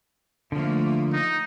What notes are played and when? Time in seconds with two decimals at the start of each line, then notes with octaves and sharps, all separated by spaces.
0.52 D3 F3 A3 A#3
1.12 D#4